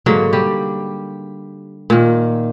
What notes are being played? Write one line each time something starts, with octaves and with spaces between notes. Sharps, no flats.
G#2 D3 F#3 A#3
G3 G4
A#2 D#3